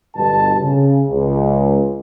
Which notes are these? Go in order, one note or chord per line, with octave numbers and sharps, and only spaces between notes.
G1 G2 B2 A5
C#3
C#2